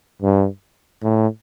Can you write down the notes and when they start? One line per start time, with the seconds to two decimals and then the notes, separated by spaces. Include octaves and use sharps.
0.22 G2
1.03 A2